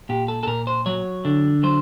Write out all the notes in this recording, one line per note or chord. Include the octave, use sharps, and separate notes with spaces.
A#2 G4
A4
A4
A#2 A#4
C5
F#3 C#5
D3
F#3 C5